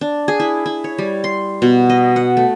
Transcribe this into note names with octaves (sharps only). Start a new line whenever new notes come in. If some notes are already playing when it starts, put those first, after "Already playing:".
D4
G#4
E4
E4
C#5
G3
C6
B2
D#5
F#5
A3